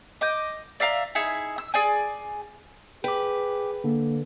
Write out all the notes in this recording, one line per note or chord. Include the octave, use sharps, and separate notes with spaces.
D#5 D6 G6
D5 E5 F5 A#5
D#4 E4 G#4
E6
G#4 D5 G#5
G#4 B4 G5 D6
D3 A#3